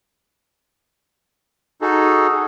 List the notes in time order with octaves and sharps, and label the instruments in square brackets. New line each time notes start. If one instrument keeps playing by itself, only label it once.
[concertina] D#4 F#4 G#4 A4